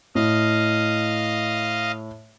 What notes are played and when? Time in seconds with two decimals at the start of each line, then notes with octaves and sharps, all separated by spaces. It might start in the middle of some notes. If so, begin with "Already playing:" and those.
0.15 A2 D#5 F5